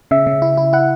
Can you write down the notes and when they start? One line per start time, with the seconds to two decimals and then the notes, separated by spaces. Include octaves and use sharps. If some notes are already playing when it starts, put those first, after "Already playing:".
0.11 C#3 E5
0.27 C#3
0.42 E4
0.57 E4
0.73 E4 F#5